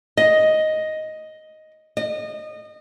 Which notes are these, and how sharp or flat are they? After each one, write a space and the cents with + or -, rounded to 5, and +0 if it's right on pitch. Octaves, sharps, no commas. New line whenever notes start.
D#5 +5
D#5 -25